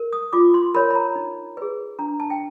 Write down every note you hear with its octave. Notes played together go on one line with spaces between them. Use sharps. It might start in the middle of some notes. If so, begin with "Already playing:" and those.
Already playing: A#4
D#6
F4 D6
C6
A#4 C#5 B5
B5
A#5
D#4
G#4 B4
D4 A#5
A5
G5